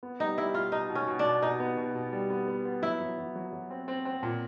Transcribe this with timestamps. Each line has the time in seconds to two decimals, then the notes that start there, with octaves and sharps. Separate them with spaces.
0.03 B3
0.20 G3 D#4
0.37 G3 E4
0.54 B2 F4
0.72 B2 D#4
0.89 B2
0.95 C#4
1.08 B2
1.19 D4
1.25 B2
1.42 B2 D#4
1.60 B3
1.77 B2
1.95 B2
2.12 G3
2.30 B3
2.48 B3
2.65 B3
2.82 F#3 E4
3.00 F#3
3.18 F#3
3.36 F#3
3.53 F#3
3.70 C4
3.88 C4
4.05 C4
4.23 A#2